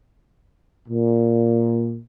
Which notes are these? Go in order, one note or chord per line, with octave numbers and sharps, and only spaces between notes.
A#2